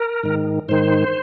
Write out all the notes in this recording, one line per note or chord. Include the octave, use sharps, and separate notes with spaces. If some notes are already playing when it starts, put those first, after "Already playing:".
Already playing: A#4
G#2 D#3
G#2 D#3 C5